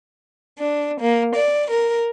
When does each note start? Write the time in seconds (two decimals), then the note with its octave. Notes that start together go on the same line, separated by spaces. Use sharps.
0.58 D4
1.01 A#3
1.34 D5
1.70 A#4